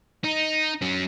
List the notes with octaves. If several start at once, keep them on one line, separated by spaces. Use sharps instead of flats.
D#4
F#3 C#4